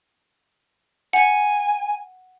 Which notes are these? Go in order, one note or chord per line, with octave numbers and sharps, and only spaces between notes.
F#5 G#5